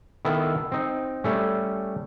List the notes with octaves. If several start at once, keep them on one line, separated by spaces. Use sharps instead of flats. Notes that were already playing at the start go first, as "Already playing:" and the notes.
D#3 B3 E4 A4
C4 D#4
G3 A3 C#4